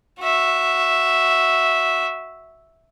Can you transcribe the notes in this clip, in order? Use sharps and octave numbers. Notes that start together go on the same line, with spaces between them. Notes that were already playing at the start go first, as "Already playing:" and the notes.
F#4 E5